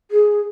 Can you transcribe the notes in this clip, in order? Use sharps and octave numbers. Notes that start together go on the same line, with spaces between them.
G#4